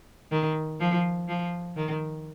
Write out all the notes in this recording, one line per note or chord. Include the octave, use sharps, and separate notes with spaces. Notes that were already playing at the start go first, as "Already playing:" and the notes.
D#3
F3
F3
D#3